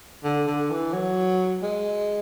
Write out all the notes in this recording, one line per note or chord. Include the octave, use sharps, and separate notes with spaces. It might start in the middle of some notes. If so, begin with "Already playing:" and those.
D3
D3
E3
F#3
G#3